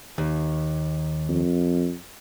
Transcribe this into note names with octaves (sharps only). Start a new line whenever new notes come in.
D#2
F2